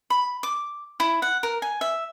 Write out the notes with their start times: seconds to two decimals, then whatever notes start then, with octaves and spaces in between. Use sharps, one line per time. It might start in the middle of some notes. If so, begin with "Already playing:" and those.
0.10 B5
0.43 D6
1.00 E4
1.22 F#5
1.43 A#4
1.62 G#5
1.81 E5